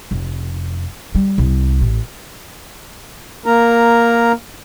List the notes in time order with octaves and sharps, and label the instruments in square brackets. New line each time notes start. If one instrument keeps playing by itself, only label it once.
[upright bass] F1
G3
C2
A1
[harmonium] A#3 A#4 A#5